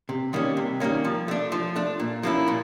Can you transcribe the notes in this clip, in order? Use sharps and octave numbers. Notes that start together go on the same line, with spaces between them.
C3
D#3 G3 A#3 C#4
C3
D#3 G3 A#3 C#4
F3
A3 D4
F3
A3 D4
A#2
F3 A#3 C#4 E4
A#2